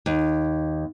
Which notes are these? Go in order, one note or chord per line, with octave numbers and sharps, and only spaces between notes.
D#2